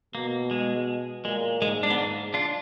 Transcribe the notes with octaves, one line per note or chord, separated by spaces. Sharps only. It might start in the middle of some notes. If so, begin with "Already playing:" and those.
B2 A#3
G#3
A#2 G#3
G#2 G#3
D4
B3
G#2 A#3
D4 F4